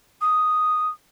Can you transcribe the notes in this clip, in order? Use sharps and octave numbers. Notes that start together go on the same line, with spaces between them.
D#6